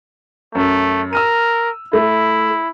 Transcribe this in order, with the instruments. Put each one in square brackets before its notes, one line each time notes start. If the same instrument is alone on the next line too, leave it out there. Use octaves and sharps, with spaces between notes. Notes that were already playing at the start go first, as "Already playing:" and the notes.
[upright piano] F#2 [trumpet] A3
[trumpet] A#4 [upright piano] E6 F6 D#7
[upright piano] A3 [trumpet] E4